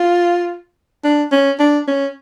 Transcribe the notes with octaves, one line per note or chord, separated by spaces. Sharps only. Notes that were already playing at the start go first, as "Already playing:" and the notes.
Already playing: F4
D4
C#4
D4
C#4